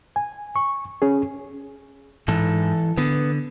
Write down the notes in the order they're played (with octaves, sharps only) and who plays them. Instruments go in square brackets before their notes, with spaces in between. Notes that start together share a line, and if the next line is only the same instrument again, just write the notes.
[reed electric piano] G#5
C#6
C#4 G#4
[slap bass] G#2 [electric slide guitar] E3 A4
[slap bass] D3 [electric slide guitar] B3